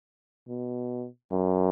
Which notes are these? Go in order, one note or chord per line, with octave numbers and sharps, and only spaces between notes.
B2
F#2